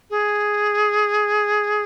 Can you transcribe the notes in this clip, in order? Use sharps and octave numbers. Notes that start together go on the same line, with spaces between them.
G#4